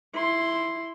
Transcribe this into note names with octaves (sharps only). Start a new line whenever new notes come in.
E4 C6